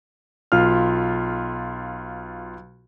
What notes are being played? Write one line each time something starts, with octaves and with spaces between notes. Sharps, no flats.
B1 F4 C6 F6